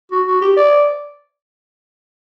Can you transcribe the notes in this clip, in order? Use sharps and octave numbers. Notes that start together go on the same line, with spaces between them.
F#4
F#4
G4
D5